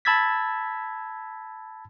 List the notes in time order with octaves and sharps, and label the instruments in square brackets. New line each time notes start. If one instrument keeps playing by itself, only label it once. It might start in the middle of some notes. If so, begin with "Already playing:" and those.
[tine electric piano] A5 B5 E6 G#6 A6 B6